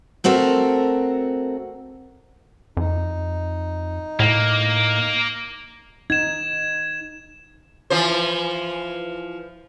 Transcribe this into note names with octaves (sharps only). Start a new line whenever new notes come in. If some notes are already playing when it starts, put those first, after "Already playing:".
A3 C4 F#4 A4 A#4
F2 D#4
A2 A#3
D#4 G#6 E7
E3 F3 C5